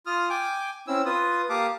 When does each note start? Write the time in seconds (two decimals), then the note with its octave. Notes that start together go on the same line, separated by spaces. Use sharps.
0.06 F4 D#6 F6
0.30 G5 G#5 D6
0.88 C4 C#4 E4 E6
1.05 F4 B4 D#6
1.49 A#3 G4 F5 A5 D6 D#6